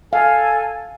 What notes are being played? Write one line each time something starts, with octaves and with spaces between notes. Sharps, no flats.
A4 F5 G#5